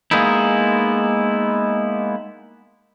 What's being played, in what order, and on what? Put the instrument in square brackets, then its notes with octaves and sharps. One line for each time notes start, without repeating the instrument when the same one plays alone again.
[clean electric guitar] G#3 A#3 B3 D#4 E4